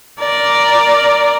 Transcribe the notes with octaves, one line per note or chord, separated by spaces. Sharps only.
A#4 D5